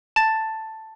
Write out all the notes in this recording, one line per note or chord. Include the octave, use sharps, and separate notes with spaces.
A5 A6